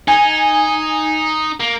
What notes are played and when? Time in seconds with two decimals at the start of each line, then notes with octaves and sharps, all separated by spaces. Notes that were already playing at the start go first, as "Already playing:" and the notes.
0.08 D#4 G#5
1.60 A#3